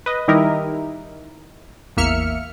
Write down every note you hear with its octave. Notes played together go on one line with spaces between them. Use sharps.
B4 D#5
D#3 G3 D#4 E4 G4 A#4
A1 E2 A#3 E5 F6 C#7